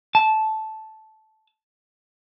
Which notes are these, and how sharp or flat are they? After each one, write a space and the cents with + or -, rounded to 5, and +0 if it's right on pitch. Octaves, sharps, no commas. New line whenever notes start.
A5 -10